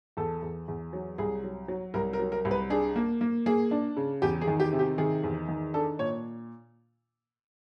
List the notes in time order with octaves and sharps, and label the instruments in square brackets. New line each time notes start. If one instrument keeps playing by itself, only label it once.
[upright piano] E2 A4
E2
E2
F#3
C2 G#4
F#3
F#3
C2 A#4
A#4
F#3
A#4
C2
B4
D4 G#4
A#3
A#3
A#3 G#4
D4
C#3
E2 G4
G#4
D#3
G4
C3
G4
D#3 G#4
E2
D#3
D4 A4
A#2 C#5